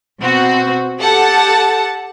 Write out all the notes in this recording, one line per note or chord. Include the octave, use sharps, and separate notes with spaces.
B2 C4 F#4
G4 A4 F#5 A5